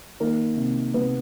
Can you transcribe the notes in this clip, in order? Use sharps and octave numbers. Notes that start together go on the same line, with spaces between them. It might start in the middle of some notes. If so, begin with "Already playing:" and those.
D#3 A#3 A#4
C3
C3 B3 B4